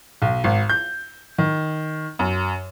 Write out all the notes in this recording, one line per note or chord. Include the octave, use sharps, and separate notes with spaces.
B1
G#1
G6
D#3
F#2